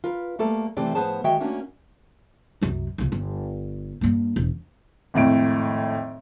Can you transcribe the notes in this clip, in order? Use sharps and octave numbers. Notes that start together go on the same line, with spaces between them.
F4 A#4 B4
G3 A3 A#3 A4
C3 E3 A3 C4 G4 D5
A2 F3 B3 G#4 C5 A5
D#3 G#3 F#4 G#4 E5 G5
A3 A#3 C#4 D4 F#4
C2 F#2
C2 F3
G1
G2 A#3
E1
G#1 F2 A2 D7